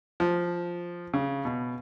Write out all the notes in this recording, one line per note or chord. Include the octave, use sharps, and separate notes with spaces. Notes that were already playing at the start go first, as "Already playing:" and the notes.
F3
C#3
B2